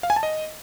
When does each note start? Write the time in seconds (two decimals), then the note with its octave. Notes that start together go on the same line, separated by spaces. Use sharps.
0.03 F5
0.10 G#5
0.16 A5
0.23 D#5